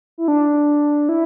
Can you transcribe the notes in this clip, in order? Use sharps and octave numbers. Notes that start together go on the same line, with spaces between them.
E4
D4
E4